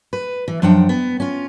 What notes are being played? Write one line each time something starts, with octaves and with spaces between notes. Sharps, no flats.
B4
E3
F#2 F3 D4 F#5 G5
B3
C#4 F4